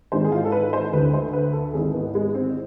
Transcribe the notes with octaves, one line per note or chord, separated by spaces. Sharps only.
G#1 G#2 E3 C5
G#4
F4
A4
B4
C5
D2 D3 B4
C5
B4
A4
G#1 G#2 E3 G#4
B3
G#3
C4